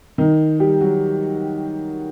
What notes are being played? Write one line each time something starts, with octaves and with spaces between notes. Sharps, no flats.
D#3 D#4
G3 G4
F#3 F#4